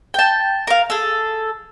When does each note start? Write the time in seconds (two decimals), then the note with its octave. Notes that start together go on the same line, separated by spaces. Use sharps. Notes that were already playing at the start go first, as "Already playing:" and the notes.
0.14 G5 A5
0.67 A#4 F5
0.90 G#4 A4